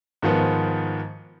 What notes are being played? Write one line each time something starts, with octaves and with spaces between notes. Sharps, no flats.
G#2 D#3 F3 B3